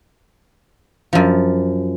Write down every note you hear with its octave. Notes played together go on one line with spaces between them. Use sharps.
F#2 F3